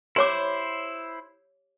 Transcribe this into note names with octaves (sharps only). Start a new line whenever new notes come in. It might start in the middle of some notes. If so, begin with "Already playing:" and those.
E4 G4 C5 C#5 D6